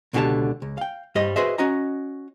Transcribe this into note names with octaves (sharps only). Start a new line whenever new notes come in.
C#2 B2 D3 F#4 G4 A5
C#2
F5 G5
G2 G3 C5 D#5
F#4 G#4 B4 C5 D#5 E5
C#4 F#4 D#5 A#5